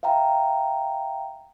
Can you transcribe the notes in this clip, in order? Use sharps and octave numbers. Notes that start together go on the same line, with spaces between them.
E5 F5 G5 A#5